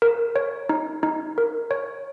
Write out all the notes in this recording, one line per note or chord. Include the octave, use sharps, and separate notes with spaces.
A#4
C#5
D#4
D#4
A#4
C#5